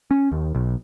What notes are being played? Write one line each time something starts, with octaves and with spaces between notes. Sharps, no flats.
C#4
D#2
B1